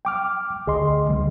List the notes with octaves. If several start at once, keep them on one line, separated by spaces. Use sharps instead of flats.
G5 D6 F6
D2 G#4 D#5 C6
D2 D3 G3